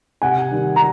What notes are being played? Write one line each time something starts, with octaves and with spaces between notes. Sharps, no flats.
C3 F#5 G#5
D#3 G3
A#5